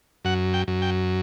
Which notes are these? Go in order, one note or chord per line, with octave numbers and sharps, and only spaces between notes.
F#2 F#5
G5
F#2
G5